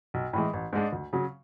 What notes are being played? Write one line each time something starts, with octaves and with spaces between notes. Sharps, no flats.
B1
A2 E3 G#3
A1
G#2 G#3 D4
D2
C#3 F#3